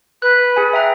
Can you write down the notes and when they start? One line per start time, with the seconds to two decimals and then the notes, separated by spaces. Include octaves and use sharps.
0.22 B4 F#6
0.56 G#4 G#5
0.73 E5 G5 A#5